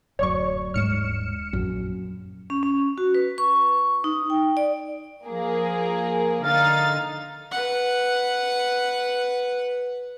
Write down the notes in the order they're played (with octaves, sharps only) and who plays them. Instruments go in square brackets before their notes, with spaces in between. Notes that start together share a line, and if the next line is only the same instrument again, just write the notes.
[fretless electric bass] D1 F#2 [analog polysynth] C#5 D5 C#6
[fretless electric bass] D#1 G#2 G#3 [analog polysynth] F6 C#7 E7
[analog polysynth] A#1 [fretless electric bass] F#2
[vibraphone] C#4
C#4
F#4
B4
C#6
D#4
G5
D5
[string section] F3 A#3 G#4
[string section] D3 D#4 A6 [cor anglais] F5
[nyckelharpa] B4 F#5